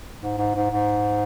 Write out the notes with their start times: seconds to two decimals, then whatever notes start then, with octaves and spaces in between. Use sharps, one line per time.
0.23 G#2
0.38 G#2
0.55 G#2
0.71 G#2